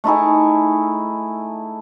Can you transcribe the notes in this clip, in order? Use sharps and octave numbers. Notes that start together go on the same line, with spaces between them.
A3 D#4 E4 G#4